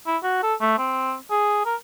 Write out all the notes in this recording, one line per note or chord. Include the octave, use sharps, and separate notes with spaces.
E4
F#4
A4
A3
C4
G#4
A#4